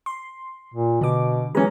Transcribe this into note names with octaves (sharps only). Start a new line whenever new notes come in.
C6
A#2
B2 D3 D6
E3 G#3 C#4 A#5